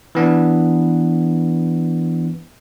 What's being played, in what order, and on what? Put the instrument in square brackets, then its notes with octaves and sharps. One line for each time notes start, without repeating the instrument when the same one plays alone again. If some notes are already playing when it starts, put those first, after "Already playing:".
[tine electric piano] E3 B3 D4